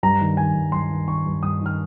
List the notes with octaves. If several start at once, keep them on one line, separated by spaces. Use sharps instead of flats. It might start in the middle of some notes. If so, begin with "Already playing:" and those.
G2 A#5
D#3
D#3 G#5
G2
G2 C6
D#3
D#3 C#6
G2
G2 D#6
D#3
F6